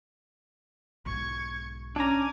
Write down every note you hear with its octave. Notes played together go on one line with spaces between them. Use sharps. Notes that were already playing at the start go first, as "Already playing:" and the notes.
B1 G#2 C#6 G#6
C#4 D4 G#5 A#5 D6